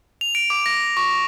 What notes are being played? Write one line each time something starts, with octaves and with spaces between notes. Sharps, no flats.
F7
D7
D6
A#6
C#6